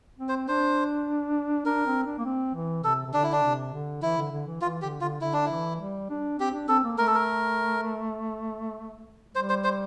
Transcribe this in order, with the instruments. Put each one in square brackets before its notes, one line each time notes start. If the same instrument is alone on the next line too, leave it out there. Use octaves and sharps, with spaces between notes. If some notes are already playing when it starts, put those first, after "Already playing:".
[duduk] C4
[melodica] C5
[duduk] D4 [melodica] C5
[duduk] D4 [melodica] A#4
[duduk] C4
D4
A#3
C4
E3
[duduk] C3 [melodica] A4
[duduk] C3
[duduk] D3 [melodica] D4
[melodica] E4
D4
[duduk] C3
D3
[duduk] E3 [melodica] E4
[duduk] D3
D3
E3
[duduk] E3 [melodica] F4
[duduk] D3 [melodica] G4
[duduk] D3 [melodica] F4
[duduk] D3 [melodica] E4
[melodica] D4
E4
[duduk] E3
G3
D4
[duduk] C4 [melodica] G4
[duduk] D4
[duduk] C4 [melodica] A4
[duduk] A#3
[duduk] A3 [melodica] A#4
[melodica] A4
A#4
[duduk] G3 [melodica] C5
[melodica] C5
C5